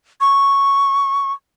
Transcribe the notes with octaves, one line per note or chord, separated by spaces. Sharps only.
C#6